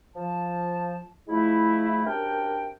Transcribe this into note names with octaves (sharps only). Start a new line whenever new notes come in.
F3 A5
F3 G#3 A3 E4
F#2 C3 D4 A#4 G5